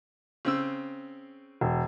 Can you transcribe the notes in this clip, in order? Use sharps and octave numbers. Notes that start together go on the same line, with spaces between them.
C#3 C4 E6
E1